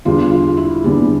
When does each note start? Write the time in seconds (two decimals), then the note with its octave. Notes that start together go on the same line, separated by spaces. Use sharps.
0.05 E2 D3 G3 F4
0.31 F4
0.57 E4
0.84 E2 D3 G3